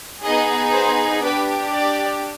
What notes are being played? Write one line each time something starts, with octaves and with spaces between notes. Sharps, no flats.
B3 D#4 G#4 D#5
C5
D4 G4 B4
D5